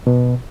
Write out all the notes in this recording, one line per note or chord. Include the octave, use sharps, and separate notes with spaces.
B2